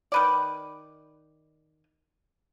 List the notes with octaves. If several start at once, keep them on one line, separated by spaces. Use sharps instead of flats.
D#3 B4 D5